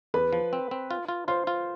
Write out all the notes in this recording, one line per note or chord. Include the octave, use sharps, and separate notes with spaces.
E2 B4 B5
F3
C4
C4
F4
F4
F4 C5 C6
F4